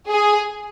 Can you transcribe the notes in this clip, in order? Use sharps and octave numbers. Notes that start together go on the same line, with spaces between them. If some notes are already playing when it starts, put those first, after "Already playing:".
G#4